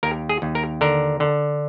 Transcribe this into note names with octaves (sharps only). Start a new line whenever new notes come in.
D#2 A#4
G#4
D#2
A#4
D3 A#4
D3